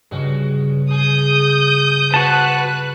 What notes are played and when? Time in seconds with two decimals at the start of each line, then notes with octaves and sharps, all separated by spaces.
0.11 G2 C#3 G#3 F#4
0.91 G#4 D#6 G6
2.14 F#4 B4 C5 A5 F#6